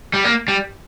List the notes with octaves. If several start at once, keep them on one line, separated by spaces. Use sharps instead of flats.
G3
A#3
G3